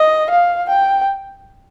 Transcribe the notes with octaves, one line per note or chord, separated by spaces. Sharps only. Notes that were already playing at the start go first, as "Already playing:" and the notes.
Already playing: D#5
F5
G5